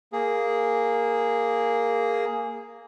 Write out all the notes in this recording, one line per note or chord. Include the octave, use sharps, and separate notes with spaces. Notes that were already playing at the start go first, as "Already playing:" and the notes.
A#3 G#4